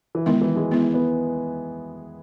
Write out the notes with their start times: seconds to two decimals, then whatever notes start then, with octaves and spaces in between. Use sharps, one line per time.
0.15 E3
0.26 D#3 G#3 B3 E4
0.41 E3
0.56 G#3
0.71 G#3 B3 E4
0.94 B3